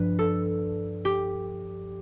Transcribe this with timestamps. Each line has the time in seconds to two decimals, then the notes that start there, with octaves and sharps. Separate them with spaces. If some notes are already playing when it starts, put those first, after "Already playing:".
Already playing: G2 F3 B4 D5
0.19 A4
1.05 G4